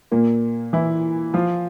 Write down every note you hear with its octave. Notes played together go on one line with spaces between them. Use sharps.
A#2 A#3
E3 E4
F3 F4